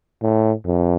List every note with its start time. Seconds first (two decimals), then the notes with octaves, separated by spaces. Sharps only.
0.22 A2
0.66 F2